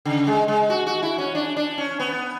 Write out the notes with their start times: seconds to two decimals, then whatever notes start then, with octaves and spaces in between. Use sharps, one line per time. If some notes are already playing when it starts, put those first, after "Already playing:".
0.05 C#3
0.27 G#3
0.48 G#3
0.70 F#4
0.87 F#4
1.03 E4
1.18 C#4
1.35 D4
1.57 D4
1.78 C#4
2.00 B3